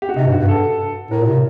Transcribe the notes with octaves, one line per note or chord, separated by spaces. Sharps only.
G4
F#4
C3 D#4
G2
F#4
G2
A4
A2 A#4
A#2
C3 A#4